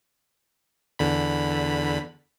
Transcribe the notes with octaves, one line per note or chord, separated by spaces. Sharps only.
E2 D3 B5